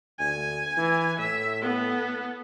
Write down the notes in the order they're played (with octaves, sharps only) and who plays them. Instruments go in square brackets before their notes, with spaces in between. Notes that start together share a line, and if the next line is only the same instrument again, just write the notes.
[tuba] D2 [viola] G#5
[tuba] E3
[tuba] A2 [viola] E5
[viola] B3 A4